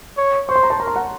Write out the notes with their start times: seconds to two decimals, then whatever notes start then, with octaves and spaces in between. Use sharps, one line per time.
0.17 C#5
0.49 C5 C#6
0.56 C6
0.63 A#5
0.70 A5 C6
0.80 A#4 A#5
0.87 C6
0.96 F#5 A#5